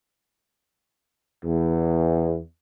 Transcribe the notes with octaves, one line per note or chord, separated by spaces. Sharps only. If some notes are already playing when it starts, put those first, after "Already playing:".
E2